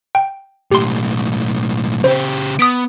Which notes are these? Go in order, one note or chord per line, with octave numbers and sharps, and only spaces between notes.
G5
B1 A2 G4 C6
C#3 G4 C5
B3 D#6 B6 D7